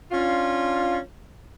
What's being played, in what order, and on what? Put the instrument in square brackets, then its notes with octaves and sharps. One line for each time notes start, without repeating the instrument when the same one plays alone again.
[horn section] C#4 D4 F4